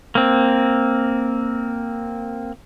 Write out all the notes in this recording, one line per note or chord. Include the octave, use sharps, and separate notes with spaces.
A#3 C4